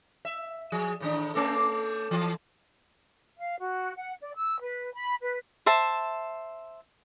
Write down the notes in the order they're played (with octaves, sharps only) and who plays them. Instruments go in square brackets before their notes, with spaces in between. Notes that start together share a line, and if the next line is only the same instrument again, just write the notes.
[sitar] E5
F3 G#4
A2 D#3 D4
A3 C#4 A4
E3
[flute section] F5
F#4
F#5
D5
E6
B4
B5
B4
[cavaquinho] C5 E5 A5